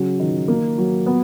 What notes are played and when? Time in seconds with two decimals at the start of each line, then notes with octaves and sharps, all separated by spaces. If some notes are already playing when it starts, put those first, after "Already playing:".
Already playing: C#3 F#3
0.19 D#3
0.48 A#3
0.78 F#3
1.06 B3